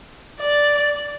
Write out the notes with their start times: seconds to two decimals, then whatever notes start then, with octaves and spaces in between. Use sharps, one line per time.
0.40 D5